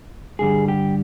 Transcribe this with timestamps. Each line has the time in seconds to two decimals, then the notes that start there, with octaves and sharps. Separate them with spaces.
0.39 G2 D3 G3 G#4
0.68 G4